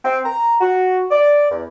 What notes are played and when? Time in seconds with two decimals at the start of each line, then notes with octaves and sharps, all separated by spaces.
0.04 C4
0.25 A#5
0.60 F#4
1.11 D5
1.51 E2